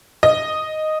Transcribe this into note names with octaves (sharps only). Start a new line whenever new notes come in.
D#5